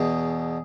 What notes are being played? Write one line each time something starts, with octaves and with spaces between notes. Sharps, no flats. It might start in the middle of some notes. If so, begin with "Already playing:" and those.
Already playing: E2 B2 G#4